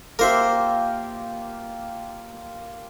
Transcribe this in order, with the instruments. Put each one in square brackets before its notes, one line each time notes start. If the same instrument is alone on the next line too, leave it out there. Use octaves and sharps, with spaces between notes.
[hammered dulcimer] A#3 F4 G4 [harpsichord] A#4 C5 E5